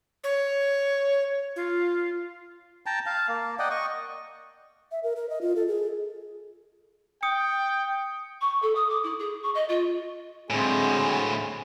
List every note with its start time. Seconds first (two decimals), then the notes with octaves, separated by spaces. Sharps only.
0.24 C#5
1.56 F4
2.86 G5 A5 A#5
3.06 F5 A5
3.28 A#3
3.59 D5 D#5 F#5 G5
3.70 D#5 C#6
4.92 E5
5.03 A#4
5.16 A#4
5.29 D#5
5.42 F4
5.56 A4
5.68 G#4
7.23 G5 D#6 C#7
8.41 C#6
8.62 A4
8.75 D#6
8.90 D6
9.03 E4
9.19 G#4
9.43 C#6
9.55 D#5
9.68 F4
10.50 D2 A2 G#3 C4 G#5